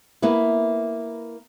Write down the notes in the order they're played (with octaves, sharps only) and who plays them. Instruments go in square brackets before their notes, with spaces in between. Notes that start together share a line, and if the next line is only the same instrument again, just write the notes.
[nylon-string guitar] A#3 B3 E4 B4